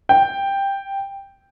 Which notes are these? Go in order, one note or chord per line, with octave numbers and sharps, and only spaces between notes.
G5